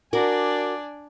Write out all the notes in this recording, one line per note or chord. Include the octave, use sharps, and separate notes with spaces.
D4 F#4 A#4 D5 G#5